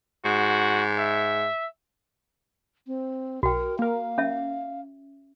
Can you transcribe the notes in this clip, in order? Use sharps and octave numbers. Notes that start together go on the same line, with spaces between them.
G#2 F#4
E5
C4
B1 F#4 A#4 G5
A#3 A#4 F5
C#4 E5